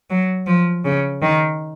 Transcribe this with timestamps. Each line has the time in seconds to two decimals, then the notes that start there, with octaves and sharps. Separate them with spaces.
0.10 F#3
0.47 F3
0.84 C#3
1.22 D#3